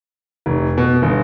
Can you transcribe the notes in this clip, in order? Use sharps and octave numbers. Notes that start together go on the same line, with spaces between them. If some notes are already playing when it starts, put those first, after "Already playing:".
F1
B2
G1